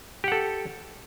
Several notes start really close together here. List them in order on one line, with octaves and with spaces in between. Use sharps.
G4 F#5 A4